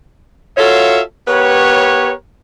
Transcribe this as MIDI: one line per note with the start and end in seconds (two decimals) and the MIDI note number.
0.58 1.00 65
0.58 1.00 66
0.58 1.00 69
0.58 1.00 73
0.58 1.00 76
0.58 1.00 77
1.27 2.12 59
1.27 2.12 67
1.27 2.12 70
1.27 2.12 71
1.27 2.12 73